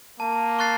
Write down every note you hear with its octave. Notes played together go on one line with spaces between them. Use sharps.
A#3 A5
C#6 F#6 A6 C7